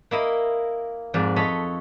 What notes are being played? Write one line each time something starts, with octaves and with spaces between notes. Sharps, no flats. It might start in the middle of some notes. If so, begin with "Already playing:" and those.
A#3 E4 D#5
F2 G#2 D5
A4 C#5 D#5 B5